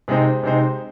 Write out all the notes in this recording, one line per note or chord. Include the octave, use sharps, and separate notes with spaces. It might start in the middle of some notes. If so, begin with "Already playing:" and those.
C3 G#3 D#4 C5
C3 G#3 D#4 C5